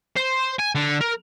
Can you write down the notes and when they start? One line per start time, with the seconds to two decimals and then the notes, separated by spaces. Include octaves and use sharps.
0.16 C5
0.59 G#5
0.75 D3
1.01 A#4